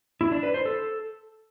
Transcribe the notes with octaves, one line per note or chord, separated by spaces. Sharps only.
E4
D4
B4
C5
A4